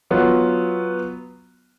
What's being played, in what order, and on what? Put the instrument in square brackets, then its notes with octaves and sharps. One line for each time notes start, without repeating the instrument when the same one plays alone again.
[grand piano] F#3 B3 F4